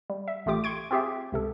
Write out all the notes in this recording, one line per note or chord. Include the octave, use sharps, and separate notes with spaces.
G3
E5
A1 A3 F4 G4 D6
C6 C#6 G#6 D7
C4 F4 G4 G#4 E5
C#2 C3 A4